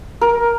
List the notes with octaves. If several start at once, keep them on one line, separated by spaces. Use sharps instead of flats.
A#4